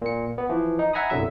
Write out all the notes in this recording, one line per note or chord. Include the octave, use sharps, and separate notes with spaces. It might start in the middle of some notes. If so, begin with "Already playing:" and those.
A#2 C#7
B3
E3 F3
D#4
E5 F#5 G#5 A#5 B5 D#6
G1 C2 D3 F#3 E5